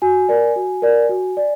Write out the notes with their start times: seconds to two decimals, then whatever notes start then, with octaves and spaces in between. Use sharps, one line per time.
0.02 F#4 G#5
0.29 A#4 D5
0.56 F#4
0.82 A#4 D5
1.09 F#4
1.37 D5